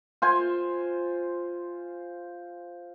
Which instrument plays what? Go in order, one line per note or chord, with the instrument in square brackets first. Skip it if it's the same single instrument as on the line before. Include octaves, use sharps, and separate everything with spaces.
[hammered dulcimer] F4 C5 G#5